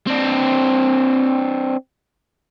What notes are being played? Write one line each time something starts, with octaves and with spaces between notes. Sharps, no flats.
C4 D4